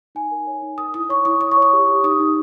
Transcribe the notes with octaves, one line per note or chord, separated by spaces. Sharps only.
D#4 G#5
A#4
C#5
D#4
A#4 D#6
E4 D#6
C#5 C#6
E4 D#6
C#5 D#6
C#6
C#5
D#6
G4
G4
D#4 D#6
D#4